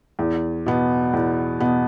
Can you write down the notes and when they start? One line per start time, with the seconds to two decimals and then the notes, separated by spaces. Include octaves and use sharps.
0.19 E2
0.66 B2 B3
1.13 E2
1.60 B2 B3